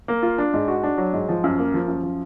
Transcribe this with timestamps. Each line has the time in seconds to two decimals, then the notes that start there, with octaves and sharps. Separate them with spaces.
0.08 A#3
0.23 F4
0.38 D4
0.54 G#2
0.68 F#4
0.83 D4
0.98 F#3
1.13 G#2
1.29 F3
1.44 F#2
1.58 A#3
1.74 F3
1.88 F#2
2.03 F3